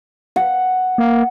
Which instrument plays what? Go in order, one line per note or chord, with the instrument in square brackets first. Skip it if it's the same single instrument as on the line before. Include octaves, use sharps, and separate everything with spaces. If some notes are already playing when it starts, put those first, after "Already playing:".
[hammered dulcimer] F#5
[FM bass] A#3